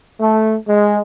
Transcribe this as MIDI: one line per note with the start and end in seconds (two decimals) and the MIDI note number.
0.20 0.54 57
0.66 0.98 56